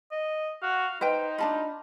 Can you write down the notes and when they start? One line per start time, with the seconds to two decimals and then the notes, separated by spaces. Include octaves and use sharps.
0.12 D#5
0.62 F#4 F5
1.01 D#4 B4 C5 D#5 G5
1.38 D4 F4 A5 B5